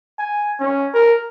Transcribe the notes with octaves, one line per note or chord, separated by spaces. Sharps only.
G#5
C#4
A#4